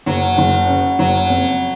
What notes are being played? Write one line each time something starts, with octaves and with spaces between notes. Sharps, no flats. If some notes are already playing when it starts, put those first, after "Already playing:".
F#1 F#3
F#1
C#3
F#1 F#3
F2